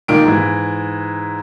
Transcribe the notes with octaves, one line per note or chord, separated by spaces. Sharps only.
A#2 D#3 D7
G#2 E3